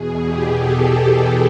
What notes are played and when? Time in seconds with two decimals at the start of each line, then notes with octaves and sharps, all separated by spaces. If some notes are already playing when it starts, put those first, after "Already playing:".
Already playing: E2 B2 G#4
0.25 G4
0.58 A4